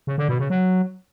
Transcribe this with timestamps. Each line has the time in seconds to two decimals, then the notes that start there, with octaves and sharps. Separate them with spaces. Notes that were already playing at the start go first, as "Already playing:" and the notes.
0.07 C#3
0.18 D3
0.29 B2
0.39 C#3
0.50 F#3